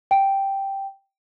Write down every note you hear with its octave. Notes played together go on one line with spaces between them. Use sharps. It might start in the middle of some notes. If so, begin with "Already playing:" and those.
G5